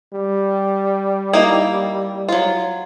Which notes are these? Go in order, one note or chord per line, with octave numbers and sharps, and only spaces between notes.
G3
A#3 D#4 E4
F#3 F4